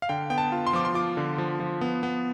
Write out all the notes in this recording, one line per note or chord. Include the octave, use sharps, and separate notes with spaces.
F5
D3 G5
B3 G5
A5
F4
C6
F3 D6
C6
F4 D6
D3
F3
F3
B3
B3